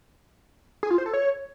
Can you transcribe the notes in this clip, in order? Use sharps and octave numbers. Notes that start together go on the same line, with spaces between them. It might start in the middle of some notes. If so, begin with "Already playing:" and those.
G#4
F4
C5
A4
C#5